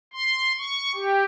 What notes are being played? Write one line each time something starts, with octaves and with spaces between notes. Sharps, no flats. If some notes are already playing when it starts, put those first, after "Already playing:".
C6
C#6
G4